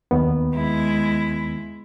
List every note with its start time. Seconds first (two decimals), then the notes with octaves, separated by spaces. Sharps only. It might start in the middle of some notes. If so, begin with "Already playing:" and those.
0.11 D#2 D#3 B3
0.55 G#3 E4